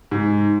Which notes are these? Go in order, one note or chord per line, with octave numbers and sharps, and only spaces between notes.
G#2